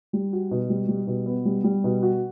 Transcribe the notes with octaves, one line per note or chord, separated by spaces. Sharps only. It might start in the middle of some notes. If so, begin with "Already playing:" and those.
G3
F#4
B2
G3
G3
B2
B3
G3
G3
B2
F#4